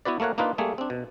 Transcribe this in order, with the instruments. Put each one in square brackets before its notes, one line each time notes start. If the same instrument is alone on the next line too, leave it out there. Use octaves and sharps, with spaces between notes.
[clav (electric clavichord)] B3 E4 F#4 B4 D5
A3 A#3 A#4 C#5 F#5
A#3 D4 D#4 F4 B4
G3 A3 A#3 G#4
C4 D4
B2